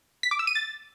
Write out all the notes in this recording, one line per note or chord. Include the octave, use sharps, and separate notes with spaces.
B6
D6
E6
D#7
A6